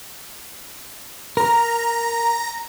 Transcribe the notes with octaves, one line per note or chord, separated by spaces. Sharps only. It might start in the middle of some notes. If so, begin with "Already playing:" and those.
A#4 A#5